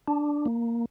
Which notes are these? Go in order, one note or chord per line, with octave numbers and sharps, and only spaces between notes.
D4
A#3